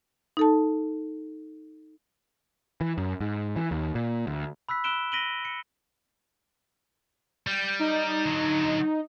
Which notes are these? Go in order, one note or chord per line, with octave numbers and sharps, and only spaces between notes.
D#4 A4 A5
E3
F#2
G#2
E3
D#2
A#2
D2
B5 E6 F#6 B6
B5 E6 F#6 D7 E7 G7
A#6 B6 D7 D#7 F#7 G7
C#7
G3 G6
D#4
D3 F#3